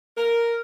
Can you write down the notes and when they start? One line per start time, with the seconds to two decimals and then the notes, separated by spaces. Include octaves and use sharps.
0.18 A#4